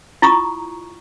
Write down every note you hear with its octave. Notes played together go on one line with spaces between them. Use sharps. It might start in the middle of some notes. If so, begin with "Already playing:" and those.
E4 F4 A#5 C#6 D#6